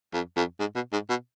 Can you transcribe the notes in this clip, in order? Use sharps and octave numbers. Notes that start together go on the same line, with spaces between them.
F2
F2
G#2
B2
G#2
B2